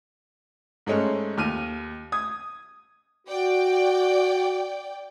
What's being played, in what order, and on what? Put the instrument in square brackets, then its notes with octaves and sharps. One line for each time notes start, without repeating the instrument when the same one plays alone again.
[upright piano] G#2 G#3 A3 C#4
D#2 F6 D#7
D#6 G#6
[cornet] F#4 [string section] D5 G5